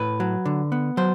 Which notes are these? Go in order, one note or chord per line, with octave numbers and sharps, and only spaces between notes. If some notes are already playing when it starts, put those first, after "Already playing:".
Already playing: A2 B4
F#3
D3
B3
F#3 C5